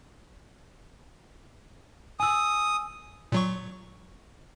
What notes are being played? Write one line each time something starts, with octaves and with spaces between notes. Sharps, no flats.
G#5 D#6 E6
A#2 F#3 C#6